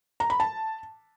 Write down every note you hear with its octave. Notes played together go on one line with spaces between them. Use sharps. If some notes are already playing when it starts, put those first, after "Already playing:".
A#5
B5
A5